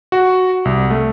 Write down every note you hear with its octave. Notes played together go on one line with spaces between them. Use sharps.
F#4
C2
A3